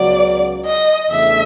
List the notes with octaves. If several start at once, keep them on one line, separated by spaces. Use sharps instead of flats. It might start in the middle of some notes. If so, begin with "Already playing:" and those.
Already playing: C#2 C#3 F#3 B3 D5
D#5
E2 C#3 E3 A3 D4 E5